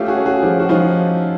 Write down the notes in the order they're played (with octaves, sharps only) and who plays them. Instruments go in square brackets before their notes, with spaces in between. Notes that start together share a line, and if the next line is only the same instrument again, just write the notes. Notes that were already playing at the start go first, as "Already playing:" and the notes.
Already playing: [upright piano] A3 C#4 [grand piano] F4 G4
[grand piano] F#4 G#4
[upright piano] C#4
[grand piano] F#4 G#4
[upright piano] F3 [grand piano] F4 G4
[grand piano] F#4
[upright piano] F3 [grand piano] D#4 F4